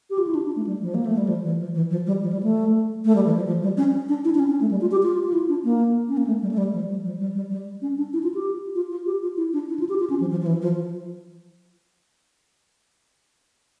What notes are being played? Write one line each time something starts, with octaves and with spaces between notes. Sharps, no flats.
G4
F4
E4
D4
D4
A3
G3
F3
A#3
A3
G3
F3
E3
F3
E3
F3
G3
F3
G3
A3
A3
G3
E3
F3
F3
G3
C#4
D4
E4
D4
C#4
C#4
A3
G3
F4
G4
F4
F4
E4
D4
A#3
C#4
A#3
A3
G3
A3
G3
F3
G3
F3
G3
G3
G3
C#4
D4
E4
F4
G4
F4
F4
G4
F4
E4
D4
E4
F4
G4
F4
C#4
F3
F3
F3
E3
F3